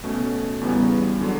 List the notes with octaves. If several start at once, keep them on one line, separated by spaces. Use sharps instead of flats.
B2 A3 C#4
E2 C#3 G3 B3
D3 F#3